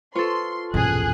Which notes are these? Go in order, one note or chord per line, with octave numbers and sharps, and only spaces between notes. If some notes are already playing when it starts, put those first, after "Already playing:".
F4 A4 B4 C5 C6 C#6
A#1 E2 G2 B2 C#4 G#4 F#6